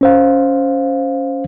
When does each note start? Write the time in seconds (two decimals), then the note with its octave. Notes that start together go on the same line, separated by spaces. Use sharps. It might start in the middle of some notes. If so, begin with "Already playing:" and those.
0.01 C#4 C5 F5